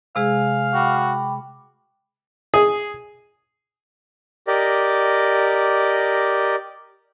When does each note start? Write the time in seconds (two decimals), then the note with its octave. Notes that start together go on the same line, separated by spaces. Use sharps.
0.16 C3 G#3 G#4 F5 G#5
0.74 F#4 G5 B5 D6
2.54 G#4
4.47 G4 A#4 D5 D#5